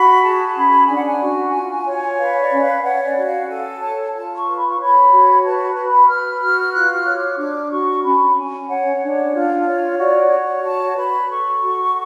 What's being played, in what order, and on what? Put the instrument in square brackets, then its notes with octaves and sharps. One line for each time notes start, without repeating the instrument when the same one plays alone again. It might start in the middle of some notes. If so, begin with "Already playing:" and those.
Already playing: [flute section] F#4 B5
G#4 A5
C#4 B5
D4 G#5
F#5
G#5
F#4
F4
C#5
B4 F5
D5
C#4
F5
C#5 F#5
D5
F#4
F5
A4 G#5
C#5 A5
F4 A5
C#6
B4
B5
C#6
C#5 B5
F#4
B4 A5
B4
B5
B4 F6
F#4 F6
F4 F#6
F#6
F6
C#5
D6
D4 D6
F#4 C#6
C#4 B5
C#4 G#5
C#5 F#5
D4
F4
C#5
F#4 D5
C#5
F#4 A5
B4 B5
A4 C#6
F#4